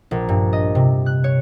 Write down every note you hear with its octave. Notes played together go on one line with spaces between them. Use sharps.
A#1
G2
D#5
C3
F#6
C#5